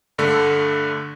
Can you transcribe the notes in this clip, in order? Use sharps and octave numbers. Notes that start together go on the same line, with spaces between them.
G2 D3 A3